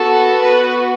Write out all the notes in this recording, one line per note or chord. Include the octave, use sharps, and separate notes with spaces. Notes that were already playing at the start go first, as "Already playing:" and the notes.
Already playing: B3 F#4 A4
B4